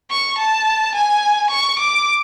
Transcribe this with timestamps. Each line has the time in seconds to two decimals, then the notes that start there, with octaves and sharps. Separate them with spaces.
0.11 C#6
0.38 A5
0.95 G#5
1.51 C#6
1.79 D6